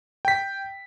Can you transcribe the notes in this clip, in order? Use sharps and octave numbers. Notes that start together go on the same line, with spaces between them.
G5 B6